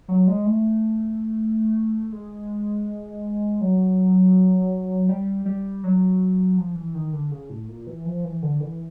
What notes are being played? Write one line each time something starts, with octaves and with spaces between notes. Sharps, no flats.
F#3
G#3
A3
G#3
F#3
G3
G3
F#3
F3
E3
D#3
D3
C#3
A2
A#2
E3
F3
E3
D3
E3